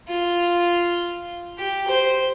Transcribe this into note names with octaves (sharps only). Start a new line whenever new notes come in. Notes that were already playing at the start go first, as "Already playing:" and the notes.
F4
G4
C5